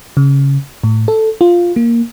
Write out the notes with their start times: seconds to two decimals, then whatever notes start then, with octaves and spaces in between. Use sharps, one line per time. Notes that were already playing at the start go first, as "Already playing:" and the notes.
0.17 C#3
0.84 A2
1.08 A4
1.41 F4
1.76 A#3